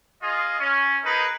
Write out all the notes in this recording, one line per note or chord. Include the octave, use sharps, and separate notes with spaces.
F4 G#4 D#5
C#4
D#4 G#4 A#4 B4